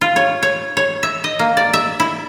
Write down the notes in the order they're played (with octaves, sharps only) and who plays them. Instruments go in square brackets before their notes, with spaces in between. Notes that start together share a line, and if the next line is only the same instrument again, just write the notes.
[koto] F4
C#5
C#5
C#5
E5
D#5
A#3
D5
E5
E4